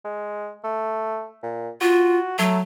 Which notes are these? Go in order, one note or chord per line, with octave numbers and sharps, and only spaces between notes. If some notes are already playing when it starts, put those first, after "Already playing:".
G#3
A3
A#2
F4 F#4
F#3 A3